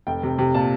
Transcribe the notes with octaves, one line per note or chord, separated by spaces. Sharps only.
F1 G5
C3
C3
A#2 A5